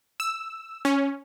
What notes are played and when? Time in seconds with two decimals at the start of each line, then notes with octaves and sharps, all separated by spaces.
0.20 E6
0.85 C#4